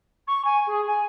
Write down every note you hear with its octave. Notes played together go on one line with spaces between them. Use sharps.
C#6
G#5
G#4
G#5